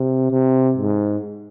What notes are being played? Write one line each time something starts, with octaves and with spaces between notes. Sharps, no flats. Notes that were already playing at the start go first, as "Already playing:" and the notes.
Already playing: C3
C3
G#2